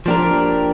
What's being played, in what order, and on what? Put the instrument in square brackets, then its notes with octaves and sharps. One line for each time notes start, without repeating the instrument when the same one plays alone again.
[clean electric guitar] F3 A#3 D4 G4 A#4